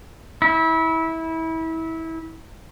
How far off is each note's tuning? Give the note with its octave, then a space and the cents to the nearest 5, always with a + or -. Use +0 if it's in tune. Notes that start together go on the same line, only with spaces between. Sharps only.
E4 -25